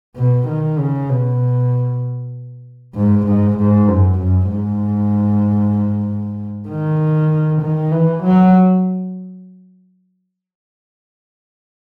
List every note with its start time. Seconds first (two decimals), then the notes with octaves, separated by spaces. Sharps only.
0.16 B2
0.48 D#3
0.78 C#3
1.09 B2
2.95 G#2
3.26 G#2
3.58 G#2
3.88 F#2
4.19 F#2
4.51 G#2
6.68 D#3
7.62 D#3
7.91 E3
8.24 F#3